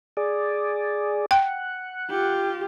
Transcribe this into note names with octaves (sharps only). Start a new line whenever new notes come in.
G#4 D5
F#5 G5
F4 G4